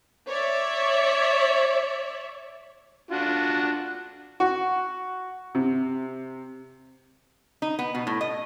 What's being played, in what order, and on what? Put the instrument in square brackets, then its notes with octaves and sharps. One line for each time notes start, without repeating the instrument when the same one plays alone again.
[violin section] C#5 D5 E5
[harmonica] D4 F4 F#4
[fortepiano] F#4
C3
[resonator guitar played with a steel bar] D#4
B3
B2
A2
D#5